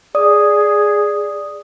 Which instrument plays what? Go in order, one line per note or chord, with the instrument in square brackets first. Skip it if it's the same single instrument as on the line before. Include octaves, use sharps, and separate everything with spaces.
[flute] G#4 [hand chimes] D5 D#6